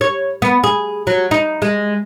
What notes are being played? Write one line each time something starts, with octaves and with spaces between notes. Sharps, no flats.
C#5
B3
G#4
F#3
D#4
G#3